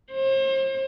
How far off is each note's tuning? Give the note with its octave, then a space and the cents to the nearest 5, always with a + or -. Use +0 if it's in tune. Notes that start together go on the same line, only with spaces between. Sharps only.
C5 +40